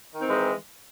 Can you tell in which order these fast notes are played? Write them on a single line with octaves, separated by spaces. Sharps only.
D#3 D#4 C4 E3 G#3